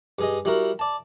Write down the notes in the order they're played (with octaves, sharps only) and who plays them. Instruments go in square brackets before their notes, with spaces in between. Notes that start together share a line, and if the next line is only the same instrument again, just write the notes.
[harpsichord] G2 G#4 D#5
G3 E4 F#4 A#4
D5 A5